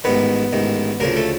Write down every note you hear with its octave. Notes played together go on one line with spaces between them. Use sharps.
A1 G#2 D#3 B3 B4
A1 G#2 D#3
D2 C#3 F3 A#3 A#4
A3 A4